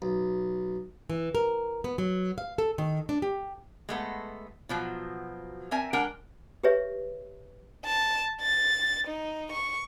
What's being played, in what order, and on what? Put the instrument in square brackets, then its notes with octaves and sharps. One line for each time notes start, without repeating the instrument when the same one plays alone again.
[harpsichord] B1
[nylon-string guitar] E3
A#4
B3
F#3
F5
A4
D#3
D4
G4
[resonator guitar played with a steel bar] G#3 A3 B3
B2 F3 F#3
C4 A#4 E5 G#5
G#3 D4 A#4 F#5 G5
[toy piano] G4 G#4 B4 C#5 E5
[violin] A5
A6
D#4
C#6